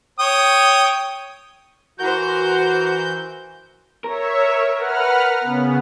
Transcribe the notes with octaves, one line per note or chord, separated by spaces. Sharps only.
C#5 G5 D#6
E3 F#4 A#4 C5 G6
A#4 C#5 E5
B4 F#5 F6
C#3 B3